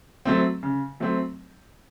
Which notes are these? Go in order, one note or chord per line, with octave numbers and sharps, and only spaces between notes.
F#3 A3 C4
C#3
F#3 A3 C4